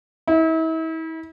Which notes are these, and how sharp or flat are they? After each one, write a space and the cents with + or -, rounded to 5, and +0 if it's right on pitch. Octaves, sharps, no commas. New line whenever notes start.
E4 -40